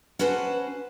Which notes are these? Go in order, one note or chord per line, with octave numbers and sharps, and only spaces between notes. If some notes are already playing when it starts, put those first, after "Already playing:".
C#4 F#4 B4 C5 A5